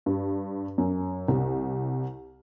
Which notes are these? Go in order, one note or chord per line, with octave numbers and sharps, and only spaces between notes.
G2
F#2
C2